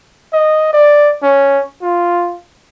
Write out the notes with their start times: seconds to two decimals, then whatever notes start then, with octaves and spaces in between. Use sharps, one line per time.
0.33 D#5
0.73 D5
1.23 C#4
1.82 F4